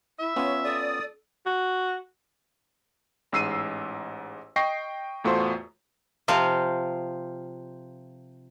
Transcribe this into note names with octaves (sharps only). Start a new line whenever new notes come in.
E4 E5
B3 C#4 F4 C#5
A4 D5 D#6
F#4
A1 G#2 E6 C7 D#7
D#5 G5 C#6 A#6 C7
E2 A2 A3 F4 F#4 C5
C3 F3 F4